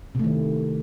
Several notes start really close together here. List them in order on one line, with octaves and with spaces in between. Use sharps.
C3 A3 D#3